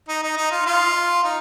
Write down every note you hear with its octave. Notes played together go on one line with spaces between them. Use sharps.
D#4
D#4
D#4
F4
F4
D#4